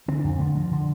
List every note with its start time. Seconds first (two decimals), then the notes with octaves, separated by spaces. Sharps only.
0.08 D3 C4
0.19 D4
0.24 F2
0.30 C4
0.39 D3 A3
0.55 G2 F3
0.71 D3